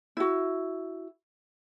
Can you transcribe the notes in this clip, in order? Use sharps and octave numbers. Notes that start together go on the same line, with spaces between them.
E4 F#4